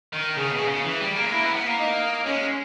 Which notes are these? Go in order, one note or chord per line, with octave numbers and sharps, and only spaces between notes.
D#3
C#3 G#4
B2
C#3
E3
G3
A#3
G#3
A#3 E4
B3
B3
A#3
D#4
G#3 C#4